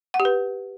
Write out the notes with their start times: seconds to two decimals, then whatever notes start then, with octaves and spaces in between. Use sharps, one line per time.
0.14 F#5
0.20 G4
0.25 B4